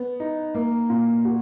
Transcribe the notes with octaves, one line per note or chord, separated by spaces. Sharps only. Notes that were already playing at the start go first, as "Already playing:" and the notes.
Already playing: B3
D#4
A#3
A#2
F#4